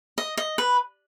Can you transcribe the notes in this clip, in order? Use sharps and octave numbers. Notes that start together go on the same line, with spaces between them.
D#5
D#5
B4